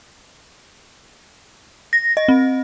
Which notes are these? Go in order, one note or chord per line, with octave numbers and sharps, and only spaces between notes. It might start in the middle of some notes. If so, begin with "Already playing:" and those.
A#6
D#5
C4